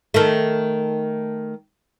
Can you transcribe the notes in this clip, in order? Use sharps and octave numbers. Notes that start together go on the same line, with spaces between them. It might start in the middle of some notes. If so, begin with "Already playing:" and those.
D#3 A3